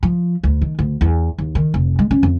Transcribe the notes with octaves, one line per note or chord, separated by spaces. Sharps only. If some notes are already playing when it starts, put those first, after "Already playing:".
F3
D2
D#3
D2
E2
D#2
D#3
F1
G#3
C#4
F2